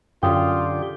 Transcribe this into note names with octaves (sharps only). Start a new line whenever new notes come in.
F#2 D3 F4 G4 G5 D#6